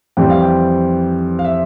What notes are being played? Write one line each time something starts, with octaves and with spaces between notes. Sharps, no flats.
F2 E3 G3 C4 G5
F5
G5
F5
E5